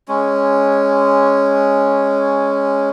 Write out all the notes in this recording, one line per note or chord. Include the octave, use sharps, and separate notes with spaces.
G#3 C#4